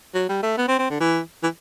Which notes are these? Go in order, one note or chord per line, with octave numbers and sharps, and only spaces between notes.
F#3
G3
A3
B3
C4
C4
D3
E3
E3